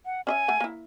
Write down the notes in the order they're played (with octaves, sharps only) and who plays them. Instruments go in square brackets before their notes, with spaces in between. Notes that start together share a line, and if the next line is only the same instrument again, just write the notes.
[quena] F#5
[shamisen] C#4 D#5 E5 [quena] G#5
[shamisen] A3 F#5
A#3 E4